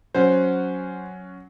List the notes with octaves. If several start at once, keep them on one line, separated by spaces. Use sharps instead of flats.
F#3 C#4 C5 F#5